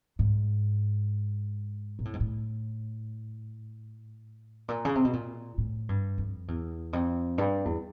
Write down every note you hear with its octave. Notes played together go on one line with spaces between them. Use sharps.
G#2
A#2
A2
G#2
A2
A#2
C#3
C3
B2
A#2
A2
G2
F2
E2
F2
G2
E2